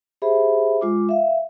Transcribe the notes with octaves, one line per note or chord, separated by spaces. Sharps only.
G4 G#4 C5 E5 B5
G#3 F4 D6
E5 F5